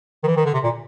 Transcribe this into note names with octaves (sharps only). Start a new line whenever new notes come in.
D#3
E3
D#3
D3
C3
A#2